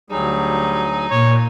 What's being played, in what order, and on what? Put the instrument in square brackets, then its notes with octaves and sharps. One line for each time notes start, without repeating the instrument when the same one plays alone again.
[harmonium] D2 F#3 G#4 [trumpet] G3 [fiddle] D#4
[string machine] A#2 [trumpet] C#5